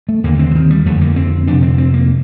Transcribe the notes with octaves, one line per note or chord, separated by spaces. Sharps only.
A3
D#2 D3 A#3
C4
D3
D#3
G3
F2 D3 A3
A#3
C4
F2 C3 D4
C4
C4
A#3